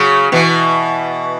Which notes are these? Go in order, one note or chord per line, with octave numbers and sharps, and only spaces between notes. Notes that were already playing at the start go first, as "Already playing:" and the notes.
Already playing: C#3 F#3
B2 E3